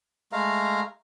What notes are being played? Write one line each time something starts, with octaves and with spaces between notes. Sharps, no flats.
G#3 A3 F5 A#5